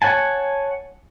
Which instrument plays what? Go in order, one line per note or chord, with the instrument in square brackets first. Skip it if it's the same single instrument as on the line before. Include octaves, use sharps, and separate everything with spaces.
[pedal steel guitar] C#5 F#5 G#5 A5